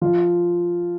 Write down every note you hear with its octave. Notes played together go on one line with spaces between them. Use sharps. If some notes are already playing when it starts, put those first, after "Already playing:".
F3 F4